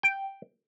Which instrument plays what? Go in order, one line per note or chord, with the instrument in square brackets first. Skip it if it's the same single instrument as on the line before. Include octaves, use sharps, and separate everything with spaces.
[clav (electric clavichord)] G5